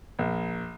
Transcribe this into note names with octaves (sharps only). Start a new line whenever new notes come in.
A#1